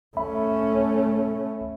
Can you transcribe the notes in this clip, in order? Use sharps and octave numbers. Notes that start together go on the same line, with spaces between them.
A3 C#4 E5 B5